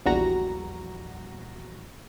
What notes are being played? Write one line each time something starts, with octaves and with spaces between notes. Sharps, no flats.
A#1 E2 G3 F#4 A#5 A#6